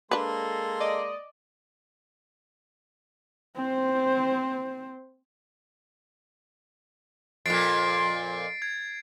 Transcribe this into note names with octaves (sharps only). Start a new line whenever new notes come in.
G#3 A#3 D4 A4 B4 C6
D5 D#5
C4 C5
F2 A#2 A6 C7 D7
G#6